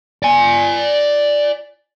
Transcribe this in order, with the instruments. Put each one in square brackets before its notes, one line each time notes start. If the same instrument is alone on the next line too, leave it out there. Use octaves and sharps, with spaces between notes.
[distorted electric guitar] D5 G#5